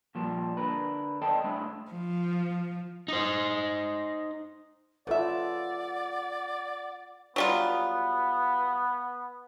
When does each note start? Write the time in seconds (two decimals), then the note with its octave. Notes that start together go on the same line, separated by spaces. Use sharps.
0.15 A#2 F3 G3 A#3
0.57 D3 D4 A#4 B4
1.22 A4 C5 D5 D#5 G5 A5
1.44 G#3 A3 D4 E4
1.91 F3
3.08 D#4 C5
5.07 C#3 F4 A4 B4 D5 E5 F#5
7.36 F#3 G3 B3 F4